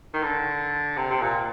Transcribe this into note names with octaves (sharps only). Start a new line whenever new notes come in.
D#3
D3
C3
C3
A#2